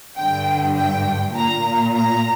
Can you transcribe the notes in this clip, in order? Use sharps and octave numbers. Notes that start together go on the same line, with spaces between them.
G2 D3 G5
G5
A#2 A#5
A#5